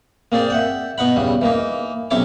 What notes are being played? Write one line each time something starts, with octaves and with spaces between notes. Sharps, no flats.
A#3 C4 G#4 D5
E5 F#5 G5
B2 D#4 F#5 B5
E2 C#3 G3
E3 A#3 D#4
B1 C3 C#4 E4 C#5 D6